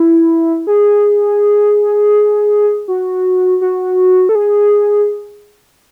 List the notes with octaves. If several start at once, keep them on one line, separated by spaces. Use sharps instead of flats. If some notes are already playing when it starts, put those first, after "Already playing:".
Already playing: E4
G#4
F#4
F#4
A4
G#4